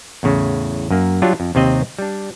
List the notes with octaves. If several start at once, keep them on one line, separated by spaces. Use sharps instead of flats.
E2 A2 C#3
F#2 A#3
F#3 G3 D4 F4 G4
F2
D#2 C3 C4 D#5
G3 D4